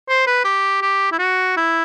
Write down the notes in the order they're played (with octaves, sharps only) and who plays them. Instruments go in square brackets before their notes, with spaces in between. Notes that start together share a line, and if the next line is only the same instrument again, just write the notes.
[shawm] C5
B4
G4
G4
E4
F#4
E4